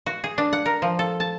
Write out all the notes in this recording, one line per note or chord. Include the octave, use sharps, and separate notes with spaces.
F#4
G#4
D4
F#5
A#4
F3
A4
A5